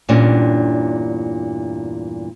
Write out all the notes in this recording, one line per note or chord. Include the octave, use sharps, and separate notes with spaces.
E2 G2 A#2 G3 C#4 D4